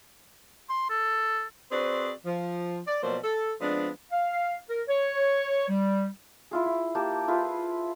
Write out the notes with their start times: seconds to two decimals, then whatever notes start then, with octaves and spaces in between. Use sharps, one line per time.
0.69 C6
0.90 A4
1.72 C4 F#4 G#4 B4 C5 D5
2.26 F3
2.88 D5
3.03 B2 F3 F#3 A#3 C5 D5
3.24 A4
3.61 F3 G#3 B3 C4 D4
4.12 F5
4.69 A#4
4.88 C#5
5.69 G3
6.51 E4 F4 G#4
6.66 E4
6.95 A#3 G4 A5
7.28 E4 F4 G#4 B4